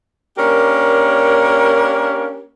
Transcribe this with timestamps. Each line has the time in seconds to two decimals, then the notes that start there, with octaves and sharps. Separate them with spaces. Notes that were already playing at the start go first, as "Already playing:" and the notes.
0.38 A#3 C#4 D4 G4 A#4